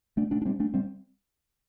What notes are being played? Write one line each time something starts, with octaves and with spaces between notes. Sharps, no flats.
A3 D4
A3 D4
D4
G3 C4
A3 D4
G3 C4